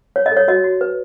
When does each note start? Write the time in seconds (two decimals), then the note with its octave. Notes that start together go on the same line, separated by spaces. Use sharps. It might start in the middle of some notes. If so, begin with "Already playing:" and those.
0.16 C#5
0.26 D#5
0.31 A4
0.37 C#5
0.48 F#4 D#5
0.64 F#4
0.81 B4